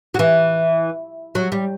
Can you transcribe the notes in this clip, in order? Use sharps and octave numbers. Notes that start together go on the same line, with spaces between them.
F#3
E3
F#3
G3